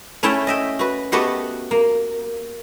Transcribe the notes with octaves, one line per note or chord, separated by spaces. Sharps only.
A3 C#4 E4 C#5 E5 G5
D#5 E5 G5
F#4 B4
A3 B3 F#4 G4 D#5 F#5
A#3